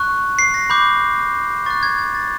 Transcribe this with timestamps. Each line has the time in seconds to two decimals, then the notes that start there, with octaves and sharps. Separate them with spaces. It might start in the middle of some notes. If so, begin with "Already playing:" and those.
Already playing: C#6 F#6
0.39 C7
0.54 A#6
0.70 B5 D6 G6
1.66 C#6 F#6 A6
1.83 G#6
1.98 G#6
2.15 A6